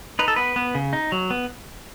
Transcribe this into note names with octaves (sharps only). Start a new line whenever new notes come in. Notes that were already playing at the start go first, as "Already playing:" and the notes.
D#4 B4
A4
B3 B4
B3
C#3
D#4
F#3
B3